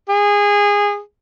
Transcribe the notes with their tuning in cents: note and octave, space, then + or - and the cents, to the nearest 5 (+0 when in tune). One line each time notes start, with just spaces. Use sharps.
G#4 -20